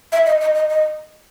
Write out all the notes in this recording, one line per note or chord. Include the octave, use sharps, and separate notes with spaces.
E5
D#5
D#5
D#5
D#5